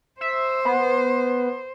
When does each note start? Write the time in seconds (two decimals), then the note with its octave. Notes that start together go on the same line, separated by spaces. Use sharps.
0.21 C5 E5
0.65 B3